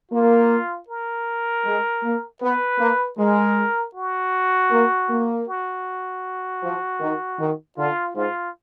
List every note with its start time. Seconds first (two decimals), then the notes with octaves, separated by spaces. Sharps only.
0.11 A#3 F4
0.88 A#4
1.65 G#3
2.02 A#3
2.41 B3 B4
2.79 A#3
3.18 G#3 A#4
3.95 F#4
4.71 A#3
5.09 A#3
5.47 F#4
6.63 F3
7.00 D#3
7.39 D#3
7.77 D3 F4
8.15 G#2 F4